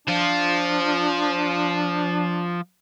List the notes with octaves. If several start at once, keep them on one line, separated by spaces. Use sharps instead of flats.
F3 D4 F4